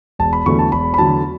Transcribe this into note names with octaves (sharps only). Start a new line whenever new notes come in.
E1 A5
B5
E2 D3 F#3 A3 C#6
A5
E1 B5
B5
E2 D3 F#3 A3 A5